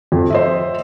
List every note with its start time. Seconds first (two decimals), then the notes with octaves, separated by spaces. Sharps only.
0.12 F2
0.30 C5 D#5 E5